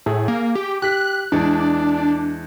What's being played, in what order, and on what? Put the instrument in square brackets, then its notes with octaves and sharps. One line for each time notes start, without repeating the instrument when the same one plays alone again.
[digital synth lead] A2 [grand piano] G#4
[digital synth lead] A#3
G4
[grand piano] G4 B6 [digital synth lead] F#6
[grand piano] E2 G#3 [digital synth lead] D4